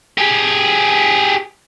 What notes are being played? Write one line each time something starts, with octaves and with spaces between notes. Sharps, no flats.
G4 G#4